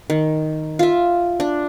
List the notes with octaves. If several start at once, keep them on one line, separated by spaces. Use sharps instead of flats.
D#3
F4 E5
D4